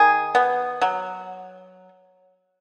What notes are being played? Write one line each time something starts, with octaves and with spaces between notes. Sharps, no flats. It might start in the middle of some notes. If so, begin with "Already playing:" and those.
Already playing: D#3 G#4
B3
F#3